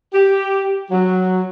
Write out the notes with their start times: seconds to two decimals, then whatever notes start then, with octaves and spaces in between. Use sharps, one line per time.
0.14 G4
0.91 F#3